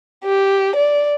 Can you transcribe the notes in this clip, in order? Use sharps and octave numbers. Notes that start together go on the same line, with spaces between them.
G4
D5